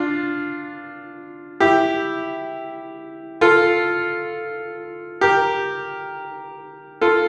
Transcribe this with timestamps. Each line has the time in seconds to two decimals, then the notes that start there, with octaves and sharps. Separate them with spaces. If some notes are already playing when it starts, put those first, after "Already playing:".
Already playing: D4 F4
1.60 E4 G4
3.41 F4 A4
5.21 G4 A#4
7.01 F4 A4